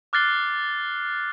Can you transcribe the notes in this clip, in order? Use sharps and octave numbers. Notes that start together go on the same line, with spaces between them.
D6 F6 F#6 A6 C7 G7